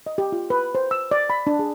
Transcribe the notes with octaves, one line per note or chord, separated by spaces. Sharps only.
D#5
G4
F4
B4
C5
E6
D5
B5
D4
G#4